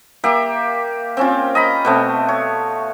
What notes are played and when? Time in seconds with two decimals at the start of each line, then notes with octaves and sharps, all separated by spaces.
0.24 A#3 G4 E5
1.17 C4 C#4 F4
1.55 D#5 A#5 B5
1.85 B2 A3 C4
2.29 C#5